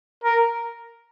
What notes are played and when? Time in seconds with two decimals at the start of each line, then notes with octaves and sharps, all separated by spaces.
0.24 A#4